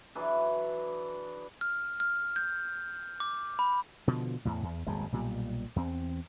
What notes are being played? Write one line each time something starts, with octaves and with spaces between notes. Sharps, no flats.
E3 F#3 D4 G#4
F6
F6
G6
D6
B5
B2 D3 F3
E2 A2
E2
D#1 G#1 F#2 G#3
B1 A#2 G3
E2 C4